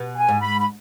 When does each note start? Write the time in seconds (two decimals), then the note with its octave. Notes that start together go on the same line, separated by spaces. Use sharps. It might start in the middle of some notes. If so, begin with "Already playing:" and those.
Already playing: B2
0.15 G#5
0.28 G#2
0.41 B5
0.60 B5